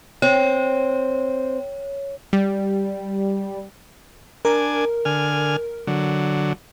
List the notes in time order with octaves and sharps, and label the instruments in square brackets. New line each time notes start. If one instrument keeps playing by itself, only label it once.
[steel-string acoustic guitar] C4 [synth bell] C#5
[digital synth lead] G3
[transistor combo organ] D4 G#5 [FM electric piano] A#4
[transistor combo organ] D3 G#5 F6
D3 F#3